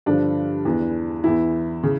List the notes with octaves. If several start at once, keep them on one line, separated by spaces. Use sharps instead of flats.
G2 D3 F3 D4
E2 E3
E2 E3 E4
C#3